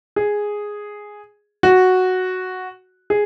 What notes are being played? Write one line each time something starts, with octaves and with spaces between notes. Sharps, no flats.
G#4
F#4
G#4